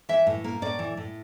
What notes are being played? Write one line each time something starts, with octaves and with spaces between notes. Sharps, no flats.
E3 E5
A2
A#3
A2 D5
E3
A2